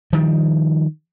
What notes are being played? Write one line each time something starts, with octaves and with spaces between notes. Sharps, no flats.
D#3 F3 G3